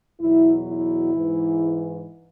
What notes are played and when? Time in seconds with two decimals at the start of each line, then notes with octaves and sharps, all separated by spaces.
0.20 E2 B2 F#3 E4
0.67 E4
1.13 G#2 E3